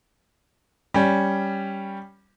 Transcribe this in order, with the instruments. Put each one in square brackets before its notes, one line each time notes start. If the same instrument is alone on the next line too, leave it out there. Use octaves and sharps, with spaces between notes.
[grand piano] G3 C#4